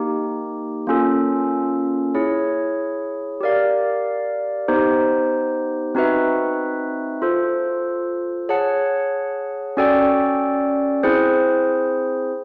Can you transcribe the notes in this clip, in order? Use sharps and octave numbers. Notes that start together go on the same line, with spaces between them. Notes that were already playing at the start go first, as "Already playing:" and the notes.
Already playing: A#3 D#4 G4
A#3 C#4 F4 A4
E4 G#4 C#5
G4 A#4 D5 F5
B3 D#4 G4 C5
C4 D#4 F#4 B4 E5
F4 A4 C5
G#4 C#5 F#5 A5
C#4 F#4 A4 D5 G5
C4 E4 G#4 C5